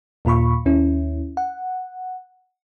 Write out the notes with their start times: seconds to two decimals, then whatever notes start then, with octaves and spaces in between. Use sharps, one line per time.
0.25 D#2 A#2 F4 B5 C#6
0.66 D#2 C#4 E4
1.37 F#5